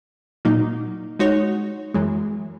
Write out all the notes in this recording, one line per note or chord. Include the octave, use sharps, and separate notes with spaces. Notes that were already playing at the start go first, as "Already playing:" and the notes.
A#2 F#3 A#3 D#4
G#3 D#4 F#4 C#5
F#2 E3 G#3